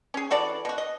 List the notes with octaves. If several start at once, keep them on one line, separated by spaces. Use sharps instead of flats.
C#4 G#4
E3 F#4 A4 D5
B2 F#4
D#5